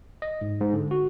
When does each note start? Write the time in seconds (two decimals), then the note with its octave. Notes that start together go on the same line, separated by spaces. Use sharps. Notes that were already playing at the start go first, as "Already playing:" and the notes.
0.22 D#5
0.41 G#2
0.60 G#2
0.73 D3
0.91 F#4